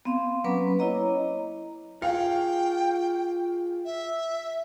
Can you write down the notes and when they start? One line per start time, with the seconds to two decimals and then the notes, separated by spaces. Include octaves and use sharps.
0.05 B3 C4 F5 C6
0.44 F#3 A#3 C#4 B4 B5 D6
0.79 E4 C#5 D#5 A#5
2.02 F4 G#4 F5 G5
3.85 E5